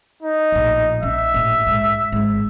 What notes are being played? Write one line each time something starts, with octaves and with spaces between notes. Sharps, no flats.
D#4
A#1 A2
C#4 E5
A#1 A2
G#2
G#1 G#2